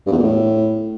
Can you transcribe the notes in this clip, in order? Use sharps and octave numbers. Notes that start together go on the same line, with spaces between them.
G2
E2
A#2
A2